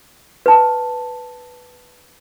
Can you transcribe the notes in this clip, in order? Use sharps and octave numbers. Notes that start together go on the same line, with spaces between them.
B4 A5